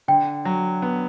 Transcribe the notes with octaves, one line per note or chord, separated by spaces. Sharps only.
D3 G5
F#3
B3